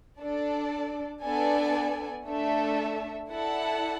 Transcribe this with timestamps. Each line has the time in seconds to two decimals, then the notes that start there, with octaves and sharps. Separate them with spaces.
0.20 D4 A4 D5
1.24 B3 D4 A4 D5 G#5
2.27 A3 D4 A4 E5
3.29 E4 A4 D5 F#5 A5